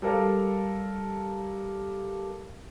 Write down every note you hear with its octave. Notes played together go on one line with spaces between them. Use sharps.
G3 A4 A#4 F5